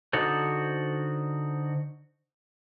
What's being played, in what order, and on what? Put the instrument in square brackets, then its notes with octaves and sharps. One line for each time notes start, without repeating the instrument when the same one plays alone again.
[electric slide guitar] D3 D#4 F#4 A4 C5